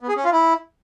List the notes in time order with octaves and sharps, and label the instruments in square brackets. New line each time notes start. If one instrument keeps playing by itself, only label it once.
[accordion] B3
G#4
C#4
F4
E4